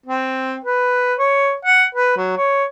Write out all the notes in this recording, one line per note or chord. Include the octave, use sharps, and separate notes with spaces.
C4
B4
C#5
F#5
B4
F#3
C#5